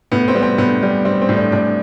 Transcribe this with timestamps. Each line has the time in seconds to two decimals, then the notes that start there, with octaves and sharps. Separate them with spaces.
0.12 A2 B3
0.28 C4
0.35 G3 B3
0.42 C4
0.58 A2 B3
0.83 G3
1.05 G3 C4
1.22 C4
1.29 A2
1.37 D4
1.52 A2 D4